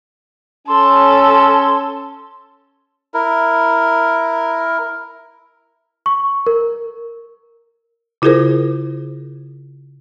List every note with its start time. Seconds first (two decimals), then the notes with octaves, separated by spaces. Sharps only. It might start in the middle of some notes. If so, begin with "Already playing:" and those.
0.68 C#4 A4 C6
3.14 E4 A#4
6.06 C#6
6.47 A#4
8.22 C#3 E4 F4 G#4 A#4 C5